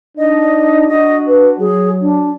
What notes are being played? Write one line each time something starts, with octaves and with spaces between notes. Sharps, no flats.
D4 D#4 D#5
D4 F#4 D#5
B4
F#3 G#4
D4